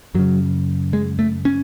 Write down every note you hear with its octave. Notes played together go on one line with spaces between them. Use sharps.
F#2 C#3 F#3
G#3
A3
C#4